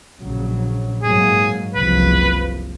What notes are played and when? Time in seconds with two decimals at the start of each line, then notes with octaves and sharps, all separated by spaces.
0.19 A#1 C#3 F#3
1.03 G#2 F#3 A#3 G#4
1.74 F#1 C2 F3 B4